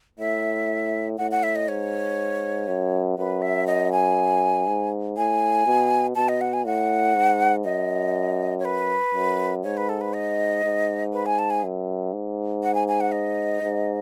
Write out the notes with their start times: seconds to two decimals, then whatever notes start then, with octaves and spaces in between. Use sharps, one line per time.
0.19 A2 E5
1.18 A2 F#5
1.31 F#5
1.43 E5
1.56 D#5
1.68 G#2 C#5
2.68 F#2
3.18 F#2 B4
3.42 E5
3.67 D#5
3.92 G#5
4.67 G#2
5.17 A2 G#5
5.66 B2
6.15 B2 A5
6.29 D#5
6.41 F#5
6.53 G#5
6.66 A2 F#5
7.15 G#2
7.65 F#2 D#5
8.59 C#5
8.65 B4
9.14 F#2
9.64 G#2 C#5
9.77 B4
9.89 A4
10.01 B4
10.13 D#5
10.64 G#2
11.13 B4
11.26 G#5
11.39 A5
11.50 G#5
11.63 F#2
12.13 G#2
12.63 F#5
12.75 G#5
12.88 G#5
13.00 F#5
13.12 D#5
13.62 G#2